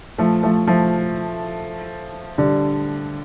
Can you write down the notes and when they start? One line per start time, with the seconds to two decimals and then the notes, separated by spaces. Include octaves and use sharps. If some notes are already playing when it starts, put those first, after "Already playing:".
0.18 F3 A3
0.43 F3 A3
0.67 F3 A3
2.38 D3 G3